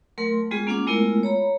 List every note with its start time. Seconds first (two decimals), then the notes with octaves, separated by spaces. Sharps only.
0.18 F#3 A3 A#4 C6
0.51 G3 G#3 B3 F4 G#4
0.67 A#3 C#4 F4 F#5 D6
0.87 G#3 A3 B3 E4 F4 A#4
1.23 C#5 A#5 B5